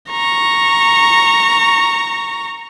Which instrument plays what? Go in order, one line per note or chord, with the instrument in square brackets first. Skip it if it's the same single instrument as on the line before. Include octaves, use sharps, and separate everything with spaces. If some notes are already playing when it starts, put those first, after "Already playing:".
[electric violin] A#5 C#6